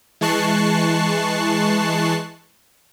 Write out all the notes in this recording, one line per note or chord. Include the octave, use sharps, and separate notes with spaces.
E3 G#3 A5 C#6 F#6 C7